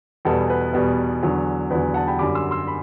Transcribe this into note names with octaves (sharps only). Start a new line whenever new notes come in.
E2 B2 G3 B3 A4
B4
E2 B2 G3 B3
E2 D3 F#3
E2 D3 F#3 B4
F#5 A5
G5 B5
F#2 D3 G3 B5 D6
C6 E6
C6 E6
B5